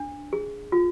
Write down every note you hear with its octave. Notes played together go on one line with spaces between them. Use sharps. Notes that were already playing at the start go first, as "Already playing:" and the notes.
Already playing: D4
G#4
F4